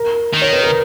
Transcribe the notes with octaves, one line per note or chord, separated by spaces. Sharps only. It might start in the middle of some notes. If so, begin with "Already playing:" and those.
Already playing: A#4
D#3
C#5
B4
A#4